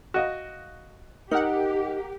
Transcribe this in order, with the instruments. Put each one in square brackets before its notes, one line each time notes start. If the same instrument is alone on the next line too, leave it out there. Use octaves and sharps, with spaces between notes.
[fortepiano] F#4 D#5 F5
[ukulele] D#4 [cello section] G4 [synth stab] A#4 F#5